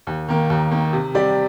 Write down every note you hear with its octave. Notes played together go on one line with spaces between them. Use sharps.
D#2
D#3 A#3
D#2
D#3 A#3
C3
G3 C4 G4 D5